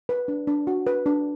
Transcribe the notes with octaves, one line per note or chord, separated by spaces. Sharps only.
B4
D4
D4
F#4
B4
D4